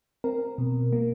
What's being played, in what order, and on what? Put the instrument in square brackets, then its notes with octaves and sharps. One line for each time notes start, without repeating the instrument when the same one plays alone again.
[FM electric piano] C4 A#4
B2
A#3